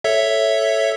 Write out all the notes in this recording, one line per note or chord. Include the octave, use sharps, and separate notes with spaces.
A4 C#5 E5